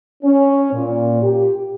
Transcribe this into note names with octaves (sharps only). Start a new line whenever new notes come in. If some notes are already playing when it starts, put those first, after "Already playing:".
C#4
A#2
G4